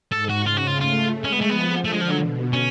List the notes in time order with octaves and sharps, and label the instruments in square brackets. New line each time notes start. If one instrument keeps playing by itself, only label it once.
[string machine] G#2 [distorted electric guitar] A4
[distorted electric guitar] F#4
[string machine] C#3 [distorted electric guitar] F4
[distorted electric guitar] F#4
F4
[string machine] A3 [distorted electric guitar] F4
[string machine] G#3
[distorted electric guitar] C#4
B3
A3
[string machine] F3 [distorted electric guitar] B3
[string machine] D3 [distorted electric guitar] A3
[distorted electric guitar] G#3
F3
F#3
[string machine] B2
[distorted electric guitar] C#4